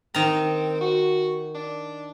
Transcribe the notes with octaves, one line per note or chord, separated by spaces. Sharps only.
D#3 C4 A#5
F#4
D4